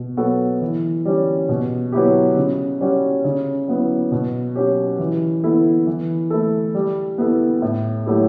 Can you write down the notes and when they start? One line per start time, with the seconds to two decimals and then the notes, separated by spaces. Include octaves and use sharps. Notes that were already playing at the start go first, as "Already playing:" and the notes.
Already playing: B2
0.17 F#3 B3 F#4 A4
0.62 E3
1.05 G3 C#4
1.49 B2
1.92 F#3 B3 E4 G4
2.36 C#3
2.81 G3 C#4 F#4
3.24 C#3
3.68 F#3 B3 E4
4.12 B2
4.55 F#3 C#4 G4
4.99 E3
5.44 B3 E4 A4
5.87 E3
6.30 A3 E4 A4
6.75 G3
7.18 B3 E4 A4
7.62 A2
8.06 F#3 A3 E4 G4